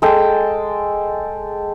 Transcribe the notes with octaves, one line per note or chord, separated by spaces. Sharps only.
G#3 A4 G5